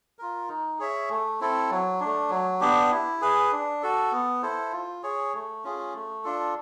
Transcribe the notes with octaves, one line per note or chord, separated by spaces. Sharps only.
F4 A#4
D#4
G#4 C#5 E5
A3
C4 E4 A4
F#3
A3 D4
F#3
B3 D4 G4
E4
G#4 B4
D4
F#4 A4
B3
E4 A4 C5
F4
G#4 C#5
A3
C#4 F4 G#4
A3
D4 F4 A4